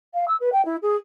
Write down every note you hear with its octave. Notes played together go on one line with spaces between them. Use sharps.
F5
E6
B4
G5
E4
G#4